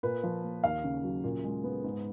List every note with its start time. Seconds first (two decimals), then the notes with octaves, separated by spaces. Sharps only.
0.03 A#2 B4
0.23 F3
0.44 A#3
0.64 D#2 F5
0.84 C#3
1.03 F#3
1.24 A#2
1.44 G#3
1.64 B3
1.84 G#2